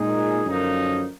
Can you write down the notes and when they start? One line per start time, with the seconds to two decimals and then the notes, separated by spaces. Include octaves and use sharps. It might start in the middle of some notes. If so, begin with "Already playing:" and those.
Already playing: A#2 G#3 D#4 G#4
0.44 F#2 D3 F3 A#3 D#4